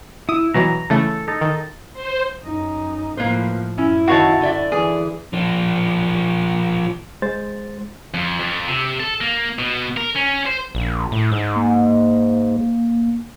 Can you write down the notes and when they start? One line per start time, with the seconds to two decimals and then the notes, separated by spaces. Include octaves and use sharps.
0.29 E4 D#6
0.54 B2 E3 F#3 A#5
0.90 C#3 E3 A3 A4
1.28 D#4 A4
1.41 D#3
1.93 C5
2.45 F#2 D#4
3.17 A2 F3 A#3 B4 C5
3.78 F#2 C#4 E4
4.08 D#3 F#4 C#5 F5 A5
4.41 D3 D5 E5
4.72 E3 G#4
5.33 F3 D4
7.22 G#3 C5 A6
8.14 F2
8.40 F2
8.68 C3
9.00 A4
9.21 A#3
9.59 B2
9.97 A#4
10.16 C#4
10.47 C5
10.75 A#1
11.12 A2
11.31 G#2
11.55 A#3